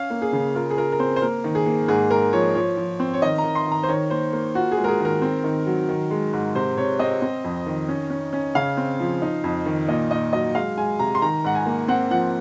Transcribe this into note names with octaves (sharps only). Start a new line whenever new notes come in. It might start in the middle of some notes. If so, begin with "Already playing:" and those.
Already playing: C#4 F5
A#3
G#4
C#3
F4 A#4
G#4
F4 A#4
A#4
C4 C5
C5
A#3 A#4
D#3
G#4
A#3
G#2 G#4
G#2 A#4
F3 C#5
F3 C#5
F3
C4
C#5
D#3 D#5
A#5
D#3
C6
D#3
A#5
C5
D#3 C#5
A#3 C5
A#3
F4 F#4
G#4
G#3
A#4
G#4
D#3
A#4
C4
D#3
F#3
D#3
G#3
G#2
C3 C5
C3 C#5
C4 D#5
C4
F2
D#3
C#4
C#4
C#4
C#3 F5
C4
F3
D#4
F2
D#3
A#2 D#5
A#2 D#5
F#3 D#5
G#3 F5
G#3 G#5
C3 A#5
C6
D#3 A#5
G#2 F#5
G#5
A#3
C4 F#5
F3 F#5